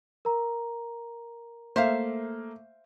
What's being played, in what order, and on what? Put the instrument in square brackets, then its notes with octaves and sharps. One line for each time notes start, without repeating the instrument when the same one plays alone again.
[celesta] A#4 A#5
[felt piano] A3 A#3 [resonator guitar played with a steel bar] C5 E5 F5